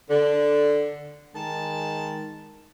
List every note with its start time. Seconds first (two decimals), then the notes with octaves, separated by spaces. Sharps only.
0.10 D3
1.36 D#3 G#3 A5